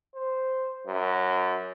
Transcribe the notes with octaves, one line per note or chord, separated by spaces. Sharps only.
C5
F#2